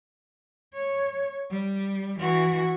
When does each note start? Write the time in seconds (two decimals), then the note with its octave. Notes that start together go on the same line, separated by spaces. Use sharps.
0.74 C#5
1.51 G3
2.20 E3 F#4